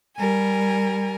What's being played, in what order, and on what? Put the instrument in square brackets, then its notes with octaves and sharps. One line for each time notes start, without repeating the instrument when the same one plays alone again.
[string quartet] G3 A#4 G#5